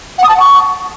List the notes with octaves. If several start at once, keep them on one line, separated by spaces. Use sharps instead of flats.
F#5
D#6
A5
F#5
C#6